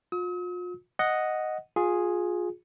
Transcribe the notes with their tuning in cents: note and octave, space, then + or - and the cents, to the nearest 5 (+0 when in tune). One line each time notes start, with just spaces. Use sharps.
F4 +40 D#6 +45
D#5 +0 F#5 +0
F4 +25 G#4 +0